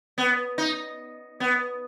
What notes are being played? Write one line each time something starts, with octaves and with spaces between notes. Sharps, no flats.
B3
D#4
B3